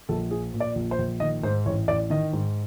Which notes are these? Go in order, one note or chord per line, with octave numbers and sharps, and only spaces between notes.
A#1 A4
F3 G#4
A#2
D5
A#1
C5
A#1
D#3 D#5
G#2 C5
A1 C#5
A1 D5
D#3 D#5
G#2